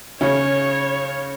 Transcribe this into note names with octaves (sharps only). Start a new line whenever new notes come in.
C#3 C#4 C#5